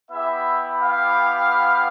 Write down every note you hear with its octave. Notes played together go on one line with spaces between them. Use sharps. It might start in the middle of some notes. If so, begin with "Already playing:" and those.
B3 E4 G4 E5
F5